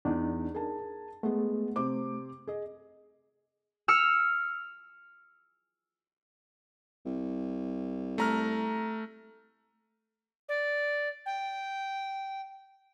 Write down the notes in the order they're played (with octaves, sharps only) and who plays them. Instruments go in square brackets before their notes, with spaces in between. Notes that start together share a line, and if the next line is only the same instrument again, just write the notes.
[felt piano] E2 [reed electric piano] D4 D#4
[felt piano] G#4 A#4 A5
[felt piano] G#3 B3 [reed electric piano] A3
[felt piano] C3 C5 D6
G#4 D#5
[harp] E6 F6 C#7
[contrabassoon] C2
[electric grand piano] A3 A#5 F6
[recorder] D5
G5